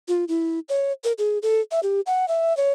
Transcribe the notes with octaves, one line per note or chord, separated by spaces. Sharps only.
F4
E4
C#5
A#4
G#4
A4
E5
G4
F#5
E5
C#5